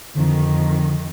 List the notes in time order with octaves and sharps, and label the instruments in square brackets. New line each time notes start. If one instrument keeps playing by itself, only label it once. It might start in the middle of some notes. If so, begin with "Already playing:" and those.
[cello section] F2 D#3 [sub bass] D3